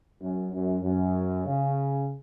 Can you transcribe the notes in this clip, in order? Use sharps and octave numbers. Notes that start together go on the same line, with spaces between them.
F#2
F#2
F#2
C#3